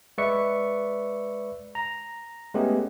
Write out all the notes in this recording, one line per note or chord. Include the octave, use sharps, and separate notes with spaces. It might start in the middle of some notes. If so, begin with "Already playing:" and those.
G#3 B4 D5 E5 C#6 C#7
A#5
G#3 A3 B3 C#4 G4